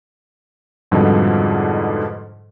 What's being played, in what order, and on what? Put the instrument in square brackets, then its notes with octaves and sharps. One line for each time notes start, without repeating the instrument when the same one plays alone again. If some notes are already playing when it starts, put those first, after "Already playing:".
[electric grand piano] F2 G#2 B2 D3 F3 G3